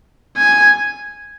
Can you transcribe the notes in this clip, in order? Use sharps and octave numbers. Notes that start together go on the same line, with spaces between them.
G#5